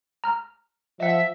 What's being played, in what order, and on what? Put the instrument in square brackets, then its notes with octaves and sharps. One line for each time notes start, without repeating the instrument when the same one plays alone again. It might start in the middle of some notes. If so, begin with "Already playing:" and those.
[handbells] A#5 F6
[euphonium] F3 [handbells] D#5 F#5 [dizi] E5